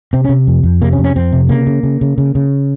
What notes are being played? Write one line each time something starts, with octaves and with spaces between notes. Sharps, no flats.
C3 C4
C#4
C3
F2
F2
C3 A#3
C#4
F2
C#4
F2 C4
C3
C#3 A#3
C#3
C#3
C#3
C#3
C#3